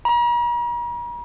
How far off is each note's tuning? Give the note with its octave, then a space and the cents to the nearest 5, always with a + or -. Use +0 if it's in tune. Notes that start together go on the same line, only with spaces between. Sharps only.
A#5 +45